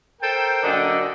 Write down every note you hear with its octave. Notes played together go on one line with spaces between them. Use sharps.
A4 A#4 C5 G5
F#2 A#2 D3 A4 D5 D#5